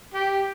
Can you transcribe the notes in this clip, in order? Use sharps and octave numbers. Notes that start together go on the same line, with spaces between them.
G4